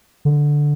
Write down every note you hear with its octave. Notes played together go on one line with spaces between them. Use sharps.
D3